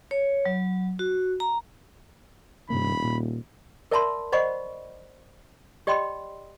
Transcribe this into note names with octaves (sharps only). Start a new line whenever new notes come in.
C#5
F#3
F#4
A#5
D#1 G2 C3 A#3 B5
A#2
A#4 D5 E5 A5 B5 C6
C5 D5 D#5 F#5 B5 C#6
G4 D5 D#5 G5 B5 C6